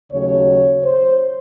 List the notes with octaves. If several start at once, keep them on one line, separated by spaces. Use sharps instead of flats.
D#2 C#3 F#3 A3 C#5
C5